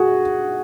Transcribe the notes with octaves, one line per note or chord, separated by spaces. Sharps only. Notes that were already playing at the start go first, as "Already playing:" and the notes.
Already playing: F#4 G#4